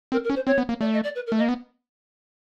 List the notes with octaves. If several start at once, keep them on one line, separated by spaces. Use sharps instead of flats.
C4 A#4
A#4
C#4
C5
C4 C#5
B3
A#3
A3 D5
D#5
D5
B4
A#4
A3
D#5
A#3
B3